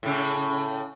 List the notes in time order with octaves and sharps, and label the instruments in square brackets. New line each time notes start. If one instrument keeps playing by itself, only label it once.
[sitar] A2 C#3